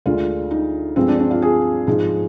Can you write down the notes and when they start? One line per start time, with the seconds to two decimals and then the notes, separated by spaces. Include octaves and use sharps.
0.06 D2 D3 G#3 F4
0.51 D#4
0.96 G2 F3 G#3 C4
1.08 D4
1.19 D4
1.31 F4
1.42 G#4
1.87 G#2 F3 G#3